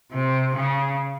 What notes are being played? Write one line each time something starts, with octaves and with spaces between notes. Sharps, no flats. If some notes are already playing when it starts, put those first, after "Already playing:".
C3
C#3